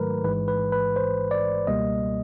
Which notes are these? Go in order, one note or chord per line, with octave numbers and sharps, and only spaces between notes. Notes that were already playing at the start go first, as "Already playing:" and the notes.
Already playing: G#2 D#3 F#3 A3 A#4 B4
A1 G#2 E3 G#3 B4
B4
B4
C5
D5
C#2 B2 G3 A#3 D#5